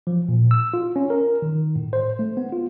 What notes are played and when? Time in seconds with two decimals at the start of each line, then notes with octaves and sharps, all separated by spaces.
0.07 F3
0.29 A#2
0.51 E6
0.74 F4
0.96 C#4
1.10 A#4
1.42 D#3
1.76 A2
1.93 C5
2.19 A3
2.37 B3
2.52 F4